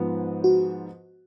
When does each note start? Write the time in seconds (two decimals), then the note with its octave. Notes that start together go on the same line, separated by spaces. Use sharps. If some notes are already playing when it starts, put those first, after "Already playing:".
Already playing: G#2 F3 B3
0.44 F#4